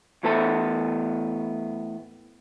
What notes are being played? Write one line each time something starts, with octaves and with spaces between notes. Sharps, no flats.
E2 A2 B3 A4 A5